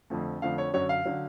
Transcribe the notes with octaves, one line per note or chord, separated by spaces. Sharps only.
F2 D3 F3 A3
F2 D3 F3 A3 F5
C#5
F#2 D3 F#3 C#5
F5
D3 F#3